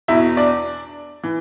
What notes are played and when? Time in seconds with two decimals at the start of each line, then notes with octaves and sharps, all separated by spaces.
0.08 E2 B2 E4 E5
0.37 D4 D5
1.23 E3